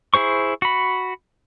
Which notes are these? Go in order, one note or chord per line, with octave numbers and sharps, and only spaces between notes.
E4 G#4 C5 C#6
F#4 B5